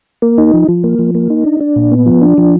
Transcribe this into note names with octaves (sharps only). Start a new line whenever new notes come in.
A#3
D#4
F3
F3
A#3
F3
A#3
D#4
D4
D4
A#2
B3
F3
D4
F3